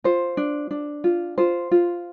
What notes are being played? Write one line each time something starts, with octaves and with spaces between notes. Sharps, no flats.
F4 C5
D4
D4
F4
F4 C5
F4